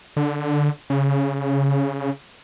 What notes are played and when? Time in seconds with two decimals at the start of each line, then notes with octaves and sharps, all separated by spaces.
0.17 D3
0.90 C#3